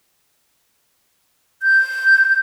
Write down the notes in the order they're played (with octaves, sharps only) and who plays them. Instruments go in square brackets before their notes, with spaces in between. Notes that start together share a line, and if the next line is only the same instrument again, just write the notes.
[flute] G6